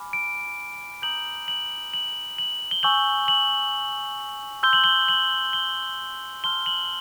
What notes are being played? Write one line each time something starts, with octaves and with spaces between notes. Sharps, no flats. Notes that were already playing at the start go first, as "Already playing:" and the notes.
Already playing: G#5 B5 D6 F6
D7
A#5 D#6 G6 F#7
F#7
F#7
F#7
G7
G#5 C#6 E6 G6 F#7
F#7
C6 E6 G6 G7
F#7
G7
F#7
G7
A5 C6 F6 G7
F#7